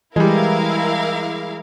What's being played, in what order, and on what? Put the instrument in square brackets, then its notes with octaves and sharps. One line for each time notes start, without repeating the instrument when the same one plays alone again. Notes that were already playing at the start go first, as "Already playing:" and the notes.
[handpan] E3 [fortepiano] G3 G#3 [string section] E4 A#4 F5